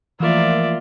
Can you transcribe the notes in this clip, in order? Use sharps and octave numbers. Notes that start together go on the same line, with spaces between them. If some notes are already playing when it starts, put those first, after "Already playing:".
E3 F3 A3 A#3 F4 A#4 D5 E5